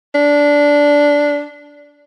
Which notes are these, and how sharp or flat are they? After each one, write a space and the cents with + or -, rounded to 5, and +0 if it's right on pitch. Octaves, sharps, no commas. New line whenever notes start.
D4 -10